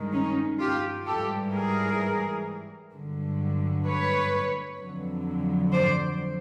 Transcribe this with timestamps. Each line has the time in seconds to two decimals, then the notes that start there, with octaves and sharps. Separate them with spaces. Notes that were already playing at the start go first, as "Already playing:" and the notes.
Already playing: G2 D#3 G#3
0.12 C#4 D#4
0.59 F4 G4
1.06 G#2 E3 G3 G4 A4
1.53 G#4 A#4
2.92 G2 D3 F#3
3.85 B4 C#5
4.79 F2 D3 F#3
5.72 C5 D5